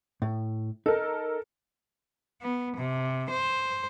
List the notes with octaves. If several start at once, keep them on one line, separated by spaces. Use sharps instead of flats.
A2
D#4 A4 A#4
B3
C3
C5